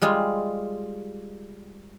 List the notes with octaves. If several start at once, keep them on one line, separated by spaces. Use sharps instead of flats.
G3 G#3 F4